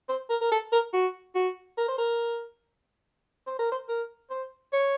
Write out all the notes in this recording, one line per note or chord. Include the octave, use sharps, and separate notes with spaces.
C5
A#4
A#4
A4
A#4
F#4
F#4
A#4
C5
A#4
C5
A#4
C5
A#4
C5
C#5